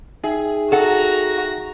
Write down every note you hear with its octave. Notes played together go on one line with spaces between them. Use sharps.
D#4 G#4 E5 G5
F#4 A4 F#5 A#5